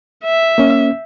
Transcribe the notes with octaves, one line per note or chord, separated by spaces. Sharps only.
E5
A#3 C#4